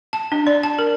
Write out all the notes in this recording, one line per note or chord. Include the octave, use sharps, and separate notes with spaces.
A5
D4
D5
A5
A#4